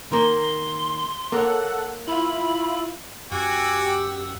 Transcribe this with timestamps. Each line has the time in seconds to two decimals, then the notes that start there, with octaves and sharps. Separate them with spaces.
0.12 D#3 A#3 C6
1.32 A#3 A4 C#5 F#5
2.07 E4 F4 B5
3.32 F#2 F#4 G4 F#5 G#5 D6 E6